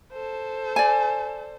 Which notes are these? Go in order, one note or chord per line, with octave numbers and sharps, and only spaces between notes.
A4 C5
D5 G#5